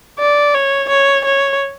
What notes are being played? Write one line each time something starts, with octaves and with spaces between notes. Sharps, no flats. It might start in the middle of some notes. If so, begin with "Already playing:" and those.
D5
C#5
C#5
C#5